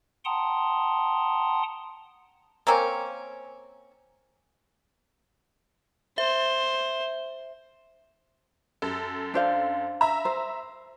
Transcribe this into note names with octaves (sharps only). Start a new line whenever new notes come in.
F#5 G5 A5 A#5 C6 D#6
A#3 C4 C#4
C5 E5
F#2 A4
D4 C5 F5
E5 A#5
C5